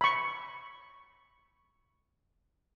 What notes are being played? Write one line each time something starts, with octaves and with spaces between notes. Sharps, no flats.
B5 C#6